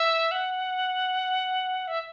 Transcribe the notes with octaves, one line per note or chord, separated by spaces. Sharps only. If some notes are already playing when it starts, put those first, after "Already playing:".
Already playing: E5
F#5
E5